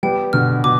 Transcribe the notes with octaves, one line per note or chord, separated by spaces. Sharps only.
G3 B3 G5
B2 D3 F6
B2 D6